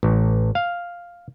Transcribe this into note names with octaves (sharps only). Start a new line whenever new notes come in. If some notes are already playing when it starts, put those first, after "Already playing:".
A1
F5